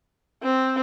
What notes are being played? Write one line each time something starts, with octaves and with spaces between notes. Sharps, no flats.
C4